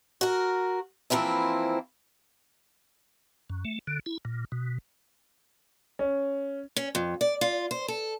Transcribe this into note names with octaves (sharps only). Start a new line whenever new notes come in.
F#4 A#4
E3 F3 A#3 C4 E4
F#2
A3
D3
E4
A#2
B2
C#4
C#4
F2
D5
F4
C5
A4